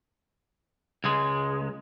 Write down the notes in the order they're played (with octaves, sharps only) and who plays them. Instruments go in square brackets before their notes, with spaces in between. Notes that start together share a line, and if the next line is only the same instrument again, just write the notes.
[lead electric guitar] C#2 G#3